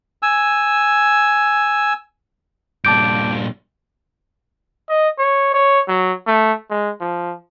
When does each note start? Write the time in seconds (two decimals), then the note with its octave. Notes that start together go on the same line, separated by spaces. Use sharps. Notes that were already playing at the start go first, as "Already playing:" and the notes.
0.23 G#5 E6
2.85 G2 A#2 A5 D6 G6 D7
4.89 D#5
5.18 C#5
5.54 C#5
5.88 F#3
6.27 A3
6.70 G#3
7.01 F3